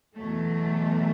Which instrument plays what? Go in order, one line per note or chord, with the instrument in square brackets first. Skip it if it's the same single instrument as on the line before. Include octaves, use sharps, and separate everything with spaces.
[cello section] E2 B2 F#3 A3